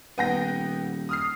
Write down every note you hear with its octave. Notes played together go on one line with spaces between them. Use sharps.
D#1 B3 G5 A#6
D#6 F6 C7